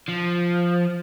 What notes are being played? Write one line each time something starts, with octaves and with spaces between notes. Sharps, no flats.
F3